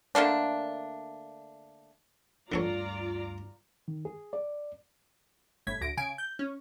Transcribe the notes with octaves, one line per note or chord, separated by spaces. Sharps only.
D3 A3 A#3 D4
D2 G2 D3 F4 A4 C#5 D5 A#5
D#3
G#4
D5
G1 A2 G#6 B6
D2 A#6 D7
C#3 G#5 D7
G6
C#4